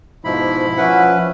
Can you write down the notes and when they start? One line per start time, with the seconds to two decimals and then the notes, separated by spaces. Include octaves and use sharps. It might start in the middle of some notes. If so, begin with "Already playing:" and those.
0.25 G#2 B2 F3 E4 B5
0.78 F3 C#4 B4 E5 F#5 G#5 D6